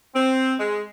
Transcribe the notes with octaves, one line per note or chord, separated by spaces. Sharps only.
C4
G#3